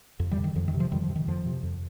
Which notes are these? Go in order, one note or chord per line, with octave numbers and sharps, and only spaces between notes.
F2
D#3 G3
C3
D#3
F2 F3
D#3
C3
F3
F2 D#3 G3
F3
C3
D#3
F2 F3
C3
F2